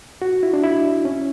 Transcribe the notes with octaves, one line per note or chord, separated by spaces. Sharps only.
F#4
E4
D4
E4
C#4